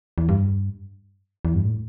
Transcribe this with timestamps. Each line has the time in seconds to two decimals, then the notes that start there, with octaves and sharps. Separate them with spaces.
0.18 E2
0.29 G2
1.45 E2
1.55 G2
1.65 A2